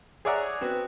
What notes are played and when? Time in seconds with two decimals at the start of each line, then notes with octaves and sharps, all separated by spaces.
0.25 G#4 C#5 D5 E5 F#5 A#5
0.61 B3 C4 F#4